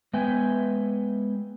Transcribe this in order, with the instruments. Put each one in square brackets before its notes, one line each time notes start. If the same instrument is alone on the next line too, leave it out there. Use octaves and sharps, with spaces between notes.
[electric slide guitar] G#3 B3 B4 E5 G5 G#5